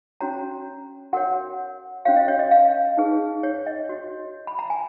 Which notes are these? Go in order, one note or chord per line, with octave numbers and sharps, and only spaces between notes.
C#4 F#4 C#5 A#5
F#4 A#4 C#5 F#5
C#4 F#4 C#5 F5
D#5
C#5
D#5
F5
D#4 G#4 B4
C#5
D#5
F#4 C#5
B5
A#5
G#5